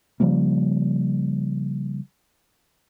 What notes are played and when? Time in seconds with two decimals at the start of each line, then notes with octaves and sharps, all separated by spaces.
0.20 C#3 F3 G3 A#3